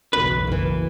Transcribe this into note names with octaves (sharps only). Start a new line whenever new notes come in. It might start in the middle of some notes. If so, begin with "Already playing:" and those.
F#1 B1 E2 B4
F#1 E3 A#3